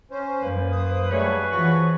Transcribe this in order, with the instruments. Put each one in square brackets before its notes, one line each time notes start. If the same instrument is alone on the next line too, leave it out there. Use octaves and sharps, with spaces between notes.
[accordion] C#4 C5
[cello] F#2 [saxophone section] A#3 B4
[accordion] C5 D#6
[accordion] F#3 G3 A3 [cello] G#4 [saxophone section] B4 C#5
[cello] E3 G#4 [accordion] F3 F#4 C#6